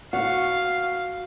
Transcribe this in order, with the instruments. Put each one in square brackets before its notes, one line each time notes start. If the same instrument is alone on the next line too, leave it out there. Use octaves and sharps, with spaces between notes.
[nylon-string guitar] F#4 [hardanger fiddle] F5